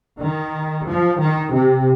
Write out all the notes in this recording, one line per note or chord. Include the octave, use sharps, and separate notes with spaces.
D#3
F3
D#3
C3